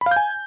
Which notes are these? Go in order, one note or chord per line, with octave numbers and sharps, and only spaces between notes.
B5
F5
G6
G#5